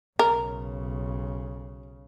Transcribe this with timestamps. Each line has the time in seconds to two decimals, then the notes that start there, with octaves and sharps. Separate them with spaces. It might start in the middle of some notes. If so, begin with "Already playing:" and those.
0.19 B1 C#3 A#4